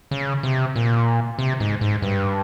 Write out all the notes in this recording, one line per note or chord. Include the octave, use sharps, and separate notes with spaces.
C#3
C3
A#2
C3
G#2
G#2
G2